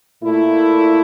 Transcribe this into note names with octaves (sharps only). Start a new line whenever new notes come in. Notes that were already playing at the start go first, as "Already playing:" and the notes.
A#2 A3 E4